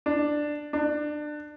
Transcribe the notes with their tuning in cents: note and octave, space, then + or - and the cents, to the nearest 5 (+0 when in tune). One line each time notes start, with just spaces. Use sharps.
D4 +10
D4 +25